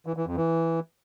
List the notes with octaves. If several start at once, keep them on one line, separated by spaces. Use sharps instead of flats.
E3
E3
F2
E3